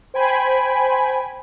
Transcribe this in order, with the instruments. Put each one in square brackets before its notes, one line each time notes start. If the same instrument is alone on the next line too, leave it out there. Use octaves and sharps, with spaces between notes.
[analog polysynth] C5 G5 G#5 B5